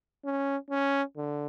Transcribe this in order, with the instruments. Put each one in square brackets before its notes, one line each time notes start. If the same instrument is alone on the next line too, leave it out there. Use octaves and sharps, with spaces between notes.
[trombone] C#4
C#4
D3